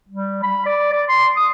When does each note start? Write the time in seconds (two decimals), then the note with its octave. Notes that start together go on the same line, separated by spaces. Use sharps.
0.09 G3
0.43 B5
0.66 D5
0.92 D5
1.08 C6
1.37 D#6